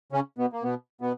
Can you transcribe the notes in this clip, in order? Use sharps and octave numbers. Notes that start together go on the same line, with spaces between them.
C#3 C#4
B2 B3
A#3
B2 B3
B2 B3